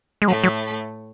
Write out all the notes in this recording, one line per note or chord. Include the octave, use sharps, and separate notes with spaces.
G#3
A2 F#3 A3
F#3